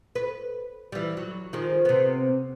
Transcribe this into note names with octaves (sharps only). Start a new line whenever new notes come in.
B4
E3 G3
F#3
D#3 F3 G#3
C3 B3